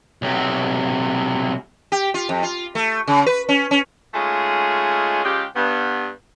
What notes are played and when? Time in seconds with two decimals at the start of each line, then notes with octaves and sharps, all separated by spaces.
0.22 B1 C3
1.92 G4
2.14 F4
2.29 F2
2.43 F4
2.75 A3
3.07 C#3
3.26 B4
3.49 C#4
3.71 C#4
4.14 G#3 A3 C#4 D#4 F4 G#4
5.24 C#3 G#3 F4 G4
5.56 G2 B3